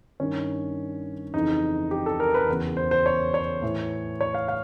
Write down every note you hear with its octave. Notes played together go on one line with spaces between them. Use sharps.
G2 D#3 C#4
F2 C#3 E3 D#4
G4
A4
A#4
B4
E2 C#3 E3
C5
C5
C#5
C#5
A2 E3
C#5
F5
F5